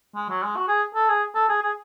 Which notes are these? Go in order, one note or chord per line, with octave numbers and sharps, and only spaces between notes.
G#3
F#3
G#3
F#4
G#4
A4
G#4
A4
G#4
G#4